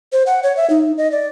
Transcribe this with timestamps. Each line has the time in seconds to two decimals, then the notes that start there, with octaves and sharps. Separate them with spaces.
0.12 C5
0.27 F#5
0.43 C#5
0.57 E5
0.70 D#4
0.97 D#5
1.12 D5